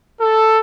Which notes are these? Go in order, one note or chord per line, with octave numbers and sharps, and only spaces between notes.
A4